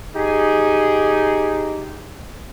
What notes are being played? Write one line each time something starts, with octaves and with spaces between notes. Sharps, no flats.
D#4 G4 G#4